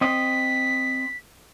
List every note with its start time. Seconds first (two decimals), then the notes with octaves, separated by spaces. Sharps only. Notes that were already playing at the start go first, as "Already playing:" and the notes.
0.01 C4 D#5 B6